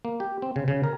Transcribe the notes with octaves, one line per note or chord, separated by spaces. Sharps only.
A#3
G4
C4
C#3
C#3
A#4